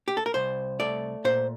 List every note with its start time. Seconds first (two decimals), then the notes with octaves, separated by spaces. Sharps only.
0.08 G4
0.17 A4
0.26 A#4
0.34 C2 C5
0.80 A3 D5
1.24 A#2 C5